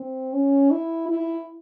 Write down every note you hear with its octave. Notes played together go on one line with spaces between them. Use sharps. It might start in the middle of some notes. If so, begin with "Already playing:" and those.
Already playing: C4
C#4
E4
E4